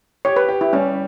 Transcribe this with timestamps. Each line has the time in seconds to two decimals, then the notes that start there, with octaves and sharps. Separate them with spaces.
0.25 G4 C#5
0.36 B4
0.48 G4
0.61 E4
0.73 G3 C#4